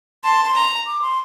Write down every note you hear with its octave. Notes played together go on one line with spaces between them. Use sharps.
A5 C6
C6
A#5
D6
C6